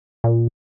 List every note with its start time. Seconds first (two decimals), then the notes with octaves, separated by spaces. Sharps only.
0.24 A#2